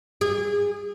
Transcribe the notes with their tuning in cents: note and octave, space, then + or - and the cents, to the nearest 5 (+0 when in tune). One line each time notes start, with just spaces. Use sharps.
G#4 -25